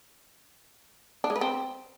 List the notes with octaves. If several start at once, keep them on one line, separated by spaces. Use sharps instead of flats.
D4
G#3
B4
C4